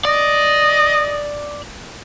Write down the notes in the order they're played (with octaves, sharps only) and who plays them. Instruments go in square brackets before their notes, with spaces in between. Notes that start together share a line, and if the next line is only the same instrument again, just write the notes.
[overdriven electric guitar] D5 [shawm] D#5